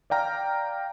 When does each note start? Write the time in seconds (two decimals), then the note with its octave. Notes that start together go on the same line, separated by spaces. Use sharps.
0.10 D5 F5 G5 A#5 F6